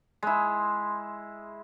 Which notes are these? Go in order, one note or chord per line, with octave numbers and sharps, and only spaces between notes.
G#3 E4